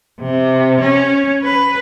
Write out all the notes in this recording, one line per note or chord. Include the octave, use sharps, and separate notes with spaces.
C3
C#4
B4